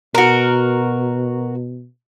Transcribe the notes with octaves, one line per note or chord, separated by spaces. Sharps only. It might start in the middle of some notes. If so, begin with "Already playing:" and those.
B2 F#4 A#4